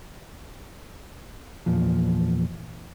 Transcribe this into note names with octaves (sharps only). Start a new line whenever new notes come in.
E2 A#2 F3